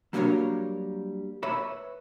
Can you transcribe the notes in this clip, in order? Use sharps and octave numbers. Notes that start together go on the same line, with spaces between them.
F#3 G3 A#3 D4 A#4 C#5
B4 C#5 E5 B5